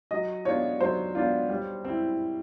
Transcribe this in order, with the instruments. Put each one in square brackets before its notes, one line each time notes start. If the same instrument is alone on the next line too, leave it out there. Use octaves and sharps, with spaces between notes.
[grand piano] F#3 [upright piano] D#5
[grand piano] B3 D4 F4 [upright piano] C#5
[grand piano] F#3 [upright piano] C5
[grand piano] B3 D4 F4
G3
C4 E4